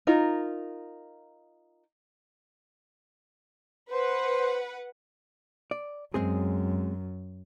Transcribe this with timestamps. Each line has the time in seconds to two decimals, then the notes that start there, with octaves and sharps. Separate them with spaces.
0.07 D#4 F4 A#4
3.90 B4 C5 F#5
5.71 D5
6.14 F#2 G#3 C4 G#4